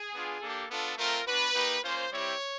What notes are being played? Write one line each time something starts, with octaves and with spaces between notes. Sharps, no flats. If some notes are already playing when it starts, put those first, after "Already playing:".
Already playing: G#4
B3 D4 F4
A#3 D4 G4 A4
B3 D4 F4 A4
A3 C4 F4 A#4
B3 D4 F#4 B4
A#3 D#4 G4
A#3 C#4 F4 C5
G3 C4 E4 G4 C#5